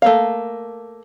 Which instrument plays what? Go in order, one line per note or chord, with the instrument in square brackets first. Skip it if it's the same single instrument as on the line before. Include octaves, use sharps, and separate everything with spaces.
[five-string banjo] A3 A#3 F5